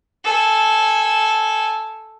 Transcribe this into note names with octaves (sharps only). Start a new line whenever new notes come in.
A4 G#5